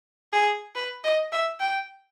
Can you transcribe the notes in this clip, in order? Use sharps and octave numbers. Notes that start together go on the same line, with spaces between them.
G#4
B4
D#5
E5
G5